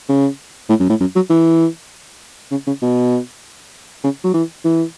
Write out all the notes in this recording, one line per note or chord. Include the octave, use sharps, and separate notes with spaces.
C#3
A2
F#2
A2
F#2
F#3
E3
C#3
C#3
B2
C#3
F#3
E3
E3